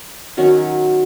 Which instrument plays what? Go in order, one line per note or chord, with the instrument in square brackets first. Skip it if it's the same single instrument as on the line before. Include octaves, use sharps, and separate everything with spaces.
[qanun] D#3 F#3 C#4 F#4